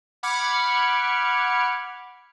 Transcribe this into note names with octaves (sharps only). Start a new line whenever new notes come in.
F#5 B5 D6 F6 G#6 C#7